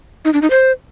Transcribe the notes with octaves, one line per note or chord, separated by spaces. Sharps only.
D#4
D4
D#4
C5